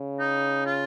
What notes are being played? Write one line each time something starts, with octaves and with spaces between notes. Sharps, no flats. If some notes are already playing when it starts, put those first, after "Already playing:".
Already playing: C#3
D#4
F4